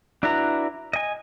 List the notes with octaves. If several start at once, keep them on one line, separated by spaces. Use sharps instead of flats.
D4 E4 F#4 B4 A#5
D#5 G#5